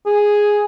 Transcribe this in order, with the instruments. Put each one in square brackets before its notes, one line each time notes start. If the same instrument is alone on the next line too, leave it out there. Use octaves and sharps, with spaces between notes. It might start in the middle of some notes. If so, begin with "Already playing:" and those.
[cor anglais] G#4